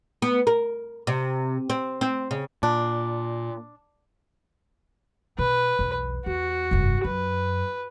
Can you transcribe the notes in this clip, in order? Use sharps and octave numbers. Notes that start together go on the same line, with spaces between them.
B3
A#4
C3
C4
C4
C#3
A#2 D4
B2 B4
B1 E2
E2 F#4
F1 G2
F#2 B4